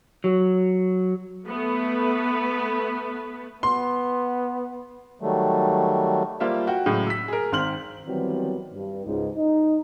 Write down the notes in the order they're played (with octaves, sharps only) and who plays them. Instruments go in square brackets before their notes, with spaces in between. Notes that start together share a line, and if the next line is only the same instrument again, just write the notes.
[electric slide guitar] F#3
[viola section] A3 B3 B4
[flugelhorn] B3 [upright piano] C6
[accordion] D#3 F#3 G3 A3
[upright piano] G3 A#3 F4 C5 E5
F#4 G5
A2 C#3 F#3 G#3
E6 B6
G#4 A#4
G#1 D#3 C4 C6 F6 F#7
[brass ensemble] D#3 E3 F#3 G3 B3 C4
G2
C#2 G#2
D#4